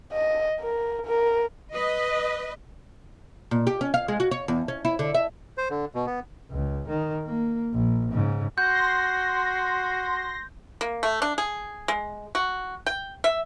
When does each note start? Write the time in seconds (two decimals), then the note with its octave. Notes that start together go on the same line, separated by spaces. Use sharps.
0.13 D#5
0.60 A#4
1.06 A#4
1.73 B4 D#5
3.51 A#2
3.67 G4
3.81 C#4
3.94 F5
4.08 G#3
4.20 F#4
4.31 C#5
4.48 E2
4.68 C#4
4.85 E4
4.99 D3
5.14 E5
5.58 C5
5.70 D3
5.95 B2
6.07 B3
6.51 C#2
6.89 D#3
7.25 A#3
7.72 A#1
8.12 G#2 C#3
8.58 F#4 C6 G6 A#6
10.81 A#3
11.03 A3
11.22 D4
11.38 G#4
11.88 G#3
12.35 F#4
12.86 G5
13.24 E5